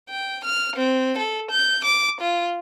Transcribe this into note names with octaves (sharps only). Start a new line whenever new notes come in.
G5
F6
C4
A4
G6
D6
F4